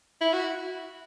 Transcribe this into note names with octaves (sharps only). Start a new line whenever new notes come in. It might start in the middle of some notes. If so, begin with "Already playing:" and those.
E4
F#4